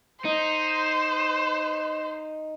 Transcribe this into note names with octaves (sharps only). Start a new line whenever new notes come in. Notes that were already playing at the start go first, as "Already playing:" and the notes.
D#4 C5